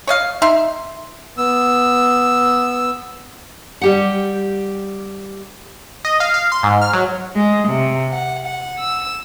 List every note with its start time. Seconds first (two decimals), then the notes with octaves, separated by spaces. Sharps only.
0.07 C#5 D#5 F5
0.42 D#4 E5 C6
1.38 B3 E6
3.81 G3 G4 F#5
6.05 D#5
6.20 F5
6.34 F5
6.52 C6
6.63 G#2
6.81 F6
6.93 F#3
7.36 G#3
7.69 C3
8.11 F#5
8.45 F#5
8.79 E6